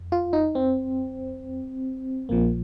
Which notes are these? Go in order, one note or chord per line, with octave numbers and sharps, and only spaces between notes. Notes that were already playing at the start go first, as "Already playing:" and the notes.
Already playing: F2
F4
D#4
C4
A#1 A#2 F3 A#3